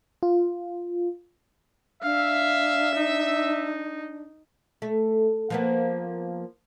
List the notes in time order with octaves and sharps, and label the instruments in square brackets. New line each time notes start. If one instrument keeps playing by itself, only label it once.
[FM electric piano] F4
[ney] D4 [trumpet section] E5 [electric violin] F5
[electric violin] D#4
[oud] A3
F3 A#3 B3